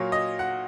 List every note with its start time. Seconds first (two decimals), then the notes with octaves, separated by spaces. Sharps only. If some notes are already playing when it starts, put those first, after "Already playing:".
Already playing: A#2 F#3 A#3 C#5
0.12 D#5
0.39 F#5